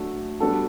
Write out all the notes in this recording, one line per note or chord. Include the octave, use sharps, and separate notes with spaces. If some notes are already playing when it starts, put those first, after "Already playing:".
Already playing: F#3 A3 D4
G3 B3 D4 F#4 A4